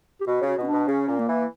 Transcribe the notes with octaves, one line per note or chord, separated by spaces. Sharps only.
G4
B2 F#4
C#3 F#4
B2
C#4
D4
B2
C#3 C#4
A#2
A#3
E3